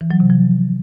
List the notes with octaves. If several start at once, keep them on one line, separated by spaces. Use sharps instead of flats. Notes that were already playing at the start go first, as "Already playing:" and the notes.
E3
F#3
C3
F3